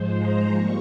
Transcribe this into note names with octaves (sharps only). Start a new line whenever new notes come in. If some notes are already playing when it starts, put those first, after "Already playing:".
Already playing: G#2 F3 G#3 C5
A#5
G3 A#3 C#6